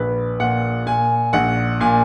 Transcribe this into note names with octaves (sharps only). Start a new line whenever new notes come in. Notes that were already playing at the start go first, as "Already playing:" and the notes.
Already playing: A#1 B4
A#2 F#5
A#2 G#5
A#1 F#5
A#2 G#5